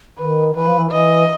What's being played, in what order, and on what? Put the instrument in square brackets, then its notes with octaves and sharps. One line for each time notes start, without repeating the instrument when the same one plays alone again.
[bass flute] D#3 [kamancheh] B4
[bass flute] E3 [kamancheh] B4
[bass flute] F3
E3
[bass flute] E3 [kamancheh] D#5